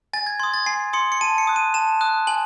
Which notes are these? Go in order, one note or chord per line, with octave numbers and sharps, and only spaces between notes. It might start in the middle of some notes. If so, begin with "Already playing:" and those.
G#5 A6
G#6
C6 D#6 G#6
A6
G#5 C7
C6 D#6 C#7
C#7
A5 D#7
C#7
D#6 F#6
D#7
A5 E7
D#6 F#6
G#5 F#7